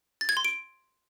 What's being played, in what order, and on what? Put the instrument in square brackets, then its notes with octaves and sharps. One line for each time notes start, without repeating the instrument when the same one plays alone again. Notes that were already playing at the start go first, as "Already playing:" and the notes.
[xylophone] A6
G#6
C6
D7